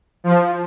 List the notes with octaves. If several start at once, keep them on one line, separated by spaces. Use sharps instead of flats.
F3